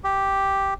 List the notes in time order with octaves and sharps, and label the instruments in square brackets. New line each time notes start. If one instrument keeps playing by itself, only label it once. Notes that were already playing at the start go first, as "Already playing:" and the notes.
[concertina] G4